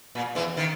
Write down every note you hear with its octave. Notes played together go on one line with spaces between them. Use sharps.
A#2
E2 E3
D#3